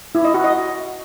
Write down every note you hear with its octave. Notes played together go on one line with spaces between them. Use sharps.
E4
D#5
F#4
D#5